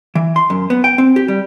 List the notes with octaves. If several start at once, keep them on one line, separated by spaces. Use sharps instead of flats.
E3
C6
F#2
B3
G5
C4
G4
G3